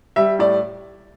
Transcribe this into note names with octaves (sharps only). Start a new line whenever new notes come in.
G3 E5
A2 D5